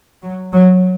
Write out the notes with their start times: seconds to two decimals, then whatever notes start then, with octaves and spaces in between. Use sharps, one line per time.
0.23 F#3
0.52 F#3